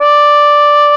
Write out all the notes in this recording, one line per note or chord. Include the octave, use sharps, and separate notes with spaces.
D5